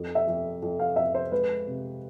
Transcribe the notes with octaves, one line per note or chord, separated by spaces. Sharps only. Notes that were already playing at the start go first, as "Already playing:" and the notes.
Already playing: F2
E5
F2
F2
F5
F2 E5
C5
G#3 B4
C3